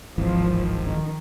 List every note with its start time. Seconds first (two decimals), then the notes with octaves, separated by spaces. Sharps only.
0.18 D1 G#1 E3 F3
0.87 D#3